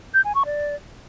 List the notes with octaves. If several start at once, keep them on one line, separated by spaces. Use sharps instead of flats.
G6
G#5
C#6
D5